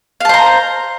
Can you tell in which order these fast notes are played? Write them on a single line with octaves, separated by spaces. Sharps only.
F5 A5 C5 A#5